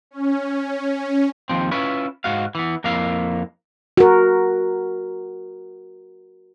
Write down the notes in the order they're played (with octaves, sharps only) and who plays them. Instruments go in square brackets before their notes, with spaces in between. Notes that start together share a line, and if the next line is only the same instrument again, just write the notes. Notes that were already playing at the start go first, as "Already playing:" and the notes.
[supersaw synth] C#4
[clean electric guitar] D#2 F3 C4
C#4 E4 F4 B4
G#2 F#4 F5
E3 B3
F2 A#3 E4 F5
[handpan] F#4 A#4